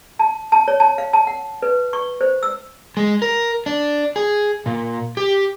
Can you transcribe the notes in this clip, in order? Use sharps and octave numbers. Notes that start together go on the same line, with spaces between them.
A5
A5
C#5
A5
F5
A5
F#5
B4
C#6
C5
E6
G#3
A#4
D4
G#4
A#2
G4